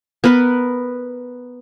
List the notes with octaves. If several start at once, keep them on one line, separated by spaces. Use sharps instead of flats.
B3 A#4 B4 B5